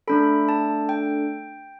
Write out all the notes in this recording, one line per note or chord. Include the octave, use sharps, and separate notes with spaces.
A3 D4 A4 B5
A5
G5